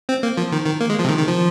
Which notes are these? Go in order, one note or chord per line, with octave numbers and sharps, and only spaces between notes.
C4
A#3
F3
D#3
D#3
A#3
G#3
F3
C3
D#3
D#3
F3